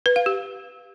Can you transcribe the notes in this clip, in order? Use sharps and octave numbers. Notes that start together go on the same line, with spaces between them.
B4
F5
G4